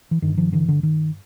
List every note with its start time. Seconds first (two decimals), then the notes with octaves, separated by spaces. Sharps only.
0.11 E3
0.22 G2 D#3
0.27 D3
0.37 D#3 F3
0.52 D3 E3
0.68 D3
0.83 D#3